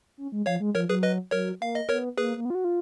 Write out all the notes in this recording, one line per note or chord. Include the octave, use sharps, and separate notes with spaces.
C#4
G#3
F3 C#5 F5
G#3
F3 A#4 C#5
F#3 G#4 B4
B4 D#5
F#3 A#4 C#5
A#3 F5
D#5
B3 A#4 C#5
A#3 G#4 B4
A#3
B3
F4
F#4
F4